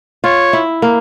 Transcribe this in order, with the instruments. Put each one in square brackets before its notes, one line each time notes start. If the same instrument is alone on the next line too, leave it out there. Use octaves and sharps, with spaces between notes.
[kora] F4 [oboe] C#5
[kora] E4
A#3